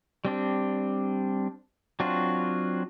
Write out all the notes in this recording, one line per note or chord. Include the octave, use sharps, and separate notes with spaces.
G3 C4 D4
F#3 C4 D4 F4 F#4